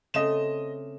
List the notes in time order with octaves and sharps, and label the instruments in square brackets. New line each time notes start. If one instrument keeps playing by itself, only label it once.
[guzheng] C#3 A3 C4 [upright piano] D#5 E7